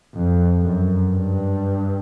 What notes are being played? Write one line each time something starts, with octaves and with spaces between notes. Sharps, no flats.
F2
F#2
G2